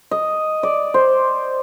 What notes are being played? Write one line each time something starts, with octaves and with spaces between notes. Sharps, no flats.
D#5
D5
C5